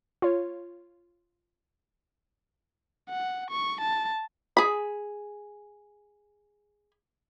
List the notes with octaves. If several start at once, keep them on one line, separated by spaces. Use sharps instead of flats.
F4 C#5
F#5
C#6
A5
G#4 B5